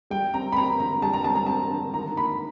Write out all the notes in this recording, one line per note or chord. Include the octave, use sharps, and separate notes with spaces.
G3 G5
C4 A#5
B5
C4 A#5
D3 A#5
G3 A5
A#5
C4 A5
A#5
C4 A5
D3
D#3 A#5
A#3 B5